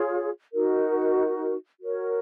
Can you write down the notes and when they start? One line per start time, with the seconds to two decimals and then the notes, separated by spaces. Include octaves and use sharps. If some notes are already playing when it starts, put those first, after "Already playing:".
Already playing: F4 G#4 C#5
0.53 D#4 F#4 A#4
1.80 F#4 A#4 C#5